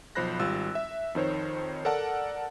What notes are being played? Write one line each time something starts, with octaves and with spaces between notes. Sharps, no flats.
B1 F3 C5 B5 F#6 A#6
G#1 G3 F4 E6
E5
F2 D#3 C5 C#5
A4 A#4 D5 F#5 A5